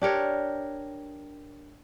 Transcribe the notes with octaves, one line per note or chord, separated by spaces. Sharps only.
D4 G4 A#4 C#5